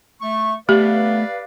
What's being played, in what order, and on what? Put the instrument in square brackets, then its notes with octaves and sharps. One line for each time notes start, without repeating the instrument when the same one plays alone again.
[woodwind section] A3 C#6
[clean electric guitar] A3 B3 B5 [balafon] G4 [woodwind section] B4 D5 F5